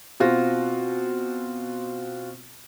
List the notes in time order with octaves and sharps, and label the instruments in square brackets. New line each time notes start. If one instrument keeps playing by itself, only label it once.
[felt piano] B2 C4 F4 F#4 A#6